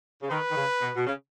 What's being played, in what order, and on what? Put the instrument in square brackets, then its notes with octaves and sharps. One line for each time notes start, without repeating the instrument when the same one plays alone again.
[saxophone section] C#3
[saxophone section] D#3 [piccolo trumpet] B4
[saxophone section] D#3
C#3
B2
B2
C#3